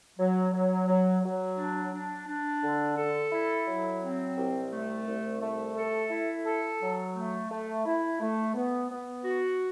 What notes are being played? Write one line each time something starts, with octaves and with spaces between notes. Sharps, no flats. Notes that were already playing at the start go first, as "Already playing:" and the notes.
F#3
F#3
F#3
F#3
D4
D4
D4
D3
A4
E4
F#3
C4
C2
A3
C2
A3
A4
E4
A4
F#3
A3
A3
E4
A3
B3
B3
F#4